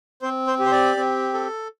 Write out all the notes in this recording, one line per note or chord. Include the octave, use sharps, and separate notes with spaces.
C4 C5
C5
G4
C5
D5
C4
A4